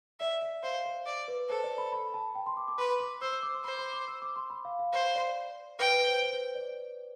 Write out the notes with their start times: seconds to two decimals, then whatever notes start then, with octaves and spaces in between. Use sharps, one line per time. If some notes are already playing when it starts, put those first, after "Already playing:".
0.20 D5 E5
0.42 E5
0.63 C5 F5
0.85 C5
1.06 D5
1.28 B4
1.49 A4 C5
1.64 D5
1.78 B5
1.92 B5
2.14 A5
2.35 G5
2.46 C6
2.57 D6
2.68 D6
2.78 B4 C6
3.00 D6
3.21 C5 E6
3.32 E6
3.43 D6
3.54 C6
3.64 C5 B5
3.79 C6
3.93 D6
4.08 E6
4.22 D6
4.36 C6
4.50 B5
4.65 F5
4.79 F5
4.93 C5 F5
5.15 D5
5.79 B4 G5
5.94 B4
6.08 C5
6.23 C5
6.33 B4
6.55 D5